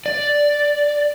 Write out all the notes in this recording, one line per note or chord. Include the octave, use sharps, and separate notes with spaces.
D5